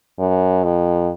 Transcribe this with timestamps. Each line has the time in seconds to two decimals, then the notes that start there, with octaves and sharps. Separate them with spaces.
0.19 F#2
0.64 F2